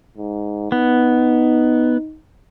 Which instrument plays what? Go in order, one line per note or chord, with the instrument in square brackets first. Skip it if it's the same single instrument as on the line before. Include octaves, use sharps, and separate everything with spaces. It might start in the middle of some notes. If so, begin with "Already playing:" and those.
[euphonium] G#2
[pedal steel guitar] B3 [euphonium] D#4